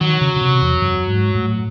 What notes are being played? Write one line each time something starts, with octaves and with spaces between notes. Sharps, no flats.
D#3 F#3
C#3
C#3
C3
E2
F#2
G#2
A2